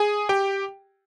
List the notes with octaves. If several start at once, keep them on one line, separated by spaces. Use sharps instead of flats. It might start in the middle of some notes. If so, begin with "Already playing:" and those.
Already playing: G#4 G#5
G4 G5